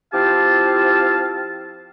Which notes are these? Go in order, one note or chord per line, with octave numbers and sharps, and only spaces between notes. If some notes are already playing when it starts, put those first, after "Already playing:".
F3 C4 E4 G4 F5 A5